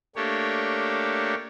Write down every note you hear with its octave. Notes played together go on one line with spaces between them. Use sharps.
A3 A#3 D4 G4 C#5